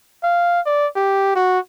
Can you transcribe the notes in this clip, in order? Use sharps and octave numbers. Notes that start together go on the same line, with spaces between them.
F5
D5
G4
F#4